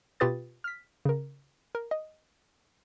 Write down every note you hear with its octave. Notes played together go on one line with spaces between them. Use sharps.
B2 F4 G4 B4 D#6 A6
F6 B6
C#3 A#4
A#4
D#5